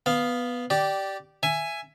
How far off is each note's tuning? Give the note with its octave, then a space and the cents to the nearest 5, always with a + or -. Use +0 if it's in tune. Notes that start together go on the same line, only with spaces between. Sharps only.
B3 +0 F5 +5
G4 -15 D5 +0
E5 +15 G#5 +0